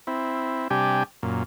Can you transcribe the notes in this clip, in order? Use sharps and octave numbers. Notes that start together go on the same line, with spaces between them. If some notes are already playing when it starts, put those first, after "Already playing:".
C4 E4
C3 G3 D4 G4 G5 G#5
F#2 A#2